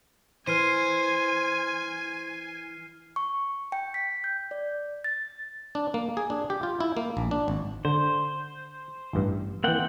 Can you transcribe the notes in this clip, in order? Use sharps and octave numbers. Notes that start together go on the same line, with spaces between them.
E3 C5 G#5 F6 C7 D#7
C#6
G5
B6
G6
D5
A6
D4
A#3
G#4
D4
G4
F4
E4
A#3
A#1
D4
G#1
D3 C5
A1 G2
E3 A#3 C4 F#5 G5